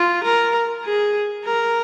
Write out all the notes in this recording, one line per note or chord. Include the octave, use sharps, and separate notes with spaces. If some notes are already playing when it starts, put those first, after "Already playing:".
Already playing: F4
A#4
G#4
A#4